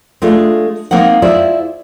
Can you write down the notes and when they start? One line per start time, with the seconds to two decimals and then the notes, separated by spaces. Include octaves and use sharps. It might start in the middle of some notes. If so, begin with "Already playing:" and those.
0.22 G#3 A3 D4 F4
0.91 G#3 A#3 C4 D#4 F#5
1.22 E4 F4 G#4 C5 D5 E5